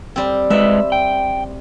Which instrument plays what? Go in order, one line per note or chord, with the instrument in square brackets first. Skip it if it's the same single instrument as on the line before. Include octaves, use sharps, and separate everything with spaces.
[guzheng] G3 C4
[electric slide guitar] G#3 B4 D#5 [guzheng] E5
[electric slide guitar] G5